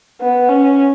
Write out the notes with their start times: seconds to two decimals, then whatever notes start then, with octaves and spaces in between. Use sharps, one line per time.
0.21 B3
0.49 C#4